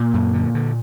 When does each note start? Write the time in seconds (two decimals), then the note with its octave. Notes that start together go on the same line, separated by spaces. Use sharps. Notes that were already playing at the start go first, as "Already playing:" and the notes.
Already playing: A#2 A#3
0.14 F#2
0.34 D3
0.55 D3